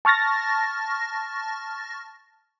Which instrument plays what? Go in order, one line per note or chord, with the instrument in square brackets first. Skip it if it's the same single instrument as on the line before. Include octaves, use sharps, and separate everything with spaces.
[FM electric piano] A5 C#6 F6 A6 A#6